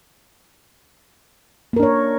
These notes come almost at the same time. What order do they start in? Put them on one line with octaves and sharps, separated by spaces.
A#3 A#4 D4 C#5